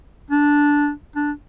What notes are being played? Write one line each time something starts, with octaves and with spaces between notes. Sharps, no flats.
D4
D4